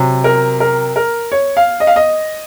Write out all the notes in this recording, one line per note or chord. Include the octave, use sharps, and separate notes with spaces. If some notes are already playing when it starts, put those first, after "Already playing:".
Already playing: C3 F#3
A#4
A#4
A#4
C#5
F5
D#5
F5
D#5